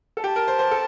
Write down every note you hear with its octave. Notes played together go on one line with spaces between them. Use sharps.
A4
G4 A5
A#4
C5
C5
A4